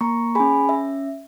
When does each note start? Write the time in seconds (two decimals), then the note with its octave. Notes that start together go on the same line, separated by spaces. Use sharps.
0.01 A#3 A#5 C#6
0.35 C#4 G#4 G#5 B5
0.69 C#4 E5